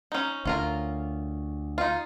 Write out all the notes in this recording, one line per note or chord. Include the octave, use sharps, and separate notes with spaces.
C#4 D#4
D2 C#4 F4 A#4
D#4 F4